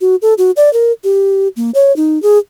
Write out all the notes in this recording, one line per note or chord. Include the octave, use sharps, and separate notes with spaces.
F#4
A4
F#4
D5
A#4
G4
A#3
C#5
D#4
G#4